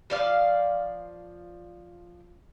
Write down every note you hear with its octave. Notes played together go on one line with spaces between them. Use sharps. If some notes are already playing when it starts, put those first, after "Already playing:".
F3 D5 F5